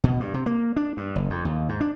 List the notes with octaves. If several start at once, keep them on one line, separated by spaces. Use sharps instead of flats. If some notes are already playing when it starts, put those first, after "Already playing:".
B2
G2
C3
A#3
D4
G2
F#1
F2
D#2
G#2
D4